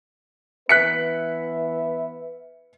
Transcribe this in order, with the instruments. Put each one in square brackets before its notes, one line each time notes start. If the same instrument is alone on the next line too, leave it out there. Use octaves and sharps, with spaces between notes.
[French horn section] E3 B3 B4 [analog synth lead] E5 [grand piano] F#6 B6 C#7